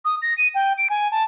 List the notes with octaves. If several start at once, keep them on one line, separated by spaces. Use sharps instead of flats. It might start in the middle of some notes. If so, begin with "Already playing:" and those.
D#6
A#6
D#7
G5
D7
G#5
A5